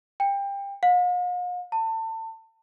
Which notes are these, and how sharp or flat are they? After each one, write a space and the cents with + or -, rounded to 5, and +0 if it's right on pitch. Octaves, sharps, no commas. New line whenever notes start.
G5 +25
F5 +45
A5 +30